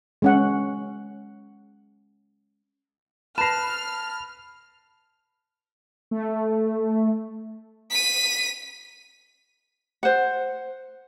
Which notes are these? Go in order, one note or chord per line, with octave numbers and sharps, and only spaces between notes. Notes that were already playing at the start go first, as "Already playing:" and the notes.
G#3 C#4 F#5
B4 A5 B5 F6 A#6 C7 E7
A3
B6 D#7
C5 F#5